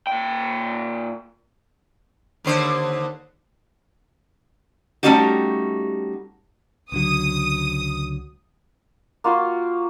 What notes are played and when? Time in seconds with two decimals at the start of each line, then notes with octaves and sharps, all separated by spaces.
0.07 A#2 G5
2.44 D#2 D3 C5
5.03 G3 A3 C#4 D#4 F#4 G4
6.92 C#2 D3 F#3 D#6
9.24 A#3 F4 F#4 C6